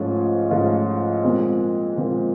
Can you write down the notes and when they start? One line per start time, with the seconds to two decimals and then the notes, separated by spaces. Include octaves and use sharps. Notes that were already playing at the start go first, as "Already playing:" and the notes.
Already playing: G#2 F3 A3 C#4 F4
0.51 G#2 F3 A3 C#4 F4
1.24 A#2 F3 G#3 C4
1.97 A#2 F3 G#3 C4